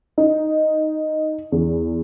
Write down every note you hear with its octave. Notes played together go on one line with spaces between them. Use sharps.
D#4
E2